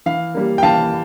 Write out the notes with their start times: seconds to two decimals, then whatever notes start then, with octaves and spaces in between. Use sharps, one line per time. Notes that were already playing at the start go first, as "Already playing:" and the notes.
0.06 E3 F5
0.34 G3 A#3
0.58 G5
0.63 E3 F5 A5